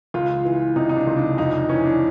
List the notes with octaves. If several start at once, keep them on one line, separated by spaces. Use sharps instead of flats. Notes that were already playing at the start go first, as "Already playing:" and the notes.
C#2 F4
E3
C3 D#4
D#4
D4
C#2
D4
F2 D#4
E3 C#4
D4